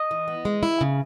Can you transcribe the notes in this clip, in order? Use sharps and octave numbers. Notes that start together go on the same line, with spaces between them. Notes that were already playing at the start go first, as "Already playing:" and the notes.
Already playing: D#5
E3
B3
G#3
E4
C#3